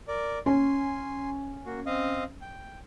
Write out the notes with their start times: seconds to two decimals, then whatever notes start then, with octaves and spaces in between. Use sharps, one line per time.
0.08 A#4 D5
0.46 C#4 G#5 C6
1.66 A#3 F#4
1.86 C4 D#5 F5
2.41 G5